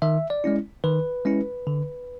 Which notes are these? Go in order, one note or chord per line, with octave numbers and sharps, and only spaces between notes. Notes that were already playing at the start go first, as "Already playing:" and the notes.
D#3 E5
D5
G#3 C#4 E4
D#3 B4
G#3 C#4 E4
D3